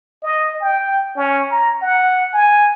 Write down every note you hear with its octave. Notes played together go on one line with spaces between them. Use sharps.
D#5
G5
C#4
A#5
F#5
G#5